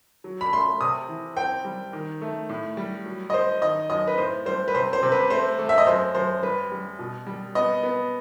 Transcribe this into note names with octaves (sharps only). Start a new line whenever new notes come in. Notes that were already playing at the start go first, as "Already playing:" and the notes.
F#3
B5
A3 C6
C3 D#6
E3
C4 G5
G3
D#3
A3
A2
G3
F#3
D#5
C4 C5
D#3 D#5
F#2 D#5
B4
A2 C5
G3 C5
B4
C3 C5
C5
C3
B4
A3 C5
A3
E5
D#5
F#2 C5
F#2 C5
G3 B4
G3
B2
G3
B3 D#5
B3